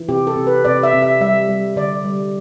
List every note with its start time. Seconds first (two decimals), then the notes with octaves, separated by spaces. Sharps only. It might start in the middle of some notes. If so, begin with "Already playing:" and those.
Already playing: E3
0.09 C3 G4
0.27 A4
0.36 C3
0.47 B4
0.65 C3 D5
0.83 E5
0.93 C3
1.02 E5
1.21 G3 E5
1.49 G3
1.76 D3 D5
2.05 G3